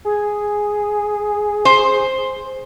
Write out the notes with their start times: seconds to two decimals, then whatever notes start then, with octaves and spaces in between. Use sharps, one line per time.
0.05 G#4
1.65 C5